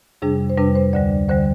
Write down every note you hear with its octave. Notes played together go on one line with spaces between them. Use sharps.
F2 C3 G3 D4 G#4
C5
F2 C3 G3 D4 B4
C5
D2 D3 G3 D5
D2 D3 G3 C5